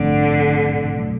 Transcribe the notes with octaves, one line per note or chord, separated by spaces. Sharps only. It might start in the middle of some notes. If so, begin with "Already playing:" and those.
Already playing: A#1 G#2 D3 F3 A3 C4
B2 F#3 A3